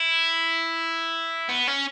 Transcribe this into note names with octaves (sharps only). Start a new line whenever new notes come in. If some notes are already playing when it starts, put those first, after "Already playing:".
Already playing: E4
B3
C#4